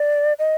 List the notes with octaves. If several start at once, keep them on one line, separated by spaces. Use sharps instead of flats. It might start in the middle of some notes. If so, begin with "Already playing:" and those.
Already playing: D5
D#5